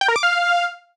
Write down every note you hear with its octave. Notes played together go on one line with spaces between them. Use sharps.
G5
A#4
D6
F5